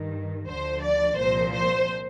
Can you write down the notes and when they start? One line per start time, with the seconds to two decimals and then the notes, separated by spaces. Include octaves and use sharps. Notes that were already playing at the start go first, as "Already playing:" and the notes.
Already playing: G2 D#3
0.48 D2 D3 F3 C5
0.84 D5
1.18 C2 A#2 F3 C5
1.53 C5